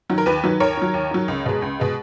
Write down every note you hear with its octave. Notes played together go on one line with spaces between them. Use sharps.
D#3 F#3
A#4
D#2 B4
D#3 F#3
D#2 A#4 C#5
D#3 F#3
D#2
D#3 F#3
C#2
B2 G#3
C#2
B2 G#3